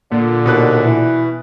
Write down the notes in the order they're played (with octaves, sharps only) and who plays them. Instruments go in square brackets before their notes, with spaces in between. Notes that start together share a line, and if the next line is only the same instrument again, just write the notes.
[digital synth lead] A#2 [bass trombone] D3
[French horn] D#2 [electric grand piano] B2 B4 F#6
[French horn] E3